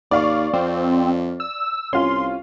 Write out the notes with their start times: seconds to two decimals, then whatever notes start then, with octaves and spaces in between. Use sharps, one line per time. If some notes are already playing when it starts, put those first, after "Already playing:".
0.11 D#2 D5 F5 C#6
0.53 F2 C4
1.40 E6
1.93 C2 C#4 F4 C6